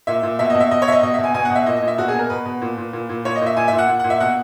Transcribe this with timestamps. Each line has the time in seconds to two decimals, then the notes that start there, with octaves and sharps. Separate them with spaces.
0.07 A#2 E5
0.23 A#2
0.39 B2 E5
0.50 B2 D#5
0.60 E5
0.71 B2 D#5
0.82 C#5
0.88 B2 E5
0.92 D#5
1.03 B2 D#5
1.14 B2 E5
1.24 G#5
1.34 B2 G#5
1.45 F#5
1.50 B2
1.55 E5
1.66 A#2 D#5
1.76 D#5
1.82 A#2
1.88 E5
1.98 B2 F#4
2.08 G#4
2.14 B2 A#4
2.30 B2 B4
2.45 B2
2.62 A#2
2.78 A#2
2.93 A#2
3.09 A#2
3.25 A#2 C#5
3.35 D#5
3.41 A#2
3.46 E5
3.57 A#2 G#5
3.68 A#2 E5
3.78 F#5
3.88 A#2
3.99 A#2 F#5
4.10 E5
4.20 B2 F#5